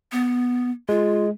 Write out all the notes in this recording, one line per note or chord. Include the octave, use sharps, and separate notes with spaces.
B3
G#3 F4